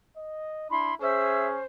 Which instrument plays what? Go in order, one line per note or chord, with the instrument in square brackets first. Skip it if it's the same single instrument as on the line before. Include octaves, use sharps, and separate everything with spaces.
[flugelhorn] D#5
[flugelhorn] D4 [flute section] E4 B5 C6
[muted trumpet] C#4 [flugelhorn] G#4 [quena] C5 [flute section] E5 E6